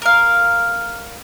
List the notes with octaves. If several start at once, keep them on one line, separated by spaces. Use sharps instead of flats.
A#4 F5